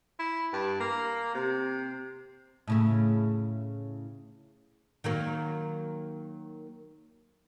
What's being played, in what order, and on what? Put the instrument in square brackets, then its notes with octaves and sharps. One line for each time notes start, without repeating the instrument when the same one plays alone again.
[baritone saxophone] E4
G2
A#3
C3
[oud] A2 C#3 E4
D#3 F#3 A#3